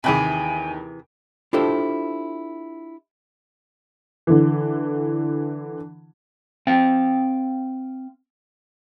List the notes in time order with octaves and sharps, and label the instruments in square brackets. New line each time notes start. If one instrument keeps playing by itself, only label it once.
[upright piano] D#2 G5 B5 [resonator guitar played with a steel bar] C3 E3 G#4 [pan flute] G#5
[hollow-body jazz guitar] D4 E4 F4 G4 A4 C5
[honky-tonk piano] D3 E3
[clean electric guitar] C4 F5 G5